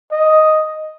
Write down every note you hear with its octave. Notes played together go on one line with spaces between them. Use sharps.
D#5